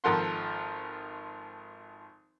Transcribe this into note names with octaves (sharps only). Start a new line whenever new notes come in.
G#1 F3 A4 A#4 F#5 C6